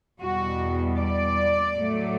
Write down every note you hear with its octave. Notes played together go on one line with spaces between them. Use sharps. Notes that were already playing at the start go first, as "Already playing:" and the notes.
E2 B2 G3 F#4
D5
A2 F#3 A3